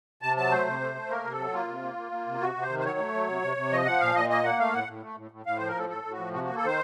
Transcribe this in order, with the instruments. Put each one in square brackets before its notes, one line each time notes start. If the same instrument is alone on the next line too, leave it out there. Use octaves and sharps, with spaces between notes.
[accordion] C3 A5
F#3 A5
A3 C5
C3
A3
A3
A#3 A#4
C3
A4
F#3
A#3 F4
C3
A#3
A#3
A#3
C3
C3 F#4
C3
C5
D#3
C5
F#3 C#5
A3
F#3
C3
C3
C3
F3 D#5
F3 F#5
A#2 F5
A#2 D#5
A#3 D#5
A#3 F#5
A3 F5
A2 F#5
A2
A3
A2
A2
A2 F5
F3 C5
A#4
A2 A4
A2 A4
A2
F#4
F3
C3 F#4
A#3 F#4
A4
D#3 C5